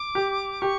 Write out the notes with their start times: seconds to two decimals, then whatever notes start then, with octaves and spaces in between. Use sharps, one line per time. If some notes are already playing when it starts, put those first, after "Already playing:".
Already playing: D6
0.15 G4
0.61 G4 C#6